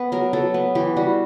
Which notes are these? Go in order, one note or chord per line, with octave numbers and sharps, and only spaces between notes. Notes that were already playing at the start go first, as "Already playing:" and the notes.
Already playing: B3
F#3 A#4
F#3 A4
B3
E3 G4
G3 F#4